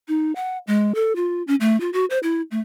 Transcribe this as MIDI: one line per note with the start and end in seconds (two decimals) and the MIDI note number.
0.08 0.34 63
0.35 0.58 78
0.67 0.94 56
0.95 1.13 69
1.16 1.43 65
1.47 1.55 61
1.60 1.79 57
1.81 1.90 65
1.93 2.05 66
2.10 2.19 72
2.23 2.42 64
2.51 2.60 57